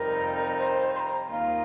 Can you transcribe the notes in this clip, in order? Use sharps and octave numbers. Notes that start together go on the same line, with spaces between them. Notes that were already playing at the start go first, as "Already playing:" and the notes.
Already playing: F2 C3 G3 D#4 A#4
C5
C6
A#5
D#2 D#3 A#3 F4 D#5 F5